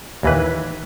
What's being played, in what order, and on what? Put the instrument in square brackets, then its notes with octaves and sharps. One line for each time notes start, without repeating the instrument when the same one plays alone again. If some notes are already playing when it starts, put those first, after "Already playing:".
[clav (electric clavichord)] D#2 E3 B4